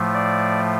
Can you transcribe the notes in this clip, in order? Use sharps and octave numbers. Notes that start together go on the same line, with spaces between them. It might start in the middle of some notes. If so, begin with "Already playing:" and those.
Already playing: A2 F3 A3
D5